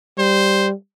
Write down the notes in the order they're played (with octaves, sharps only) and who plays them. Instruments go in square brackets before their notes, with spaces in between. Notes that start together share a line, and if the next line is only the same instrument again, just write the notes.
[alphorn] G3 [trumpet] C5